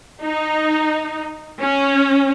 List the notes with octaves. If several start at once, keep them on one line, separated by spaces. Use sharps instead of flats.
D#4
C#4